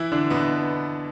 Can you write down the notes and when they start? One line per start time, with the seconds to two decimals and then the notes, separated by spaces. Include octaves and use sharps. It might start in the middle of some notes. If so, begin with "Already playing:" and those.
Already playing: E3 E4
0.12 D3 D4
0.30 B2 B3